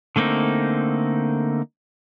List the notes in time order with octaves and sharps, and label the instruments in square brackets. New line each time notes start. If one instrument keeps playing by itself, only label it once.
[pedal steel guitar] D3 A3 A#3 C4 D#4